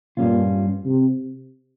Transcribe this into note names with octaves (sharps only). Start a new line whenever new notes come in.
G2 A#2 G3 C#4 F4
C3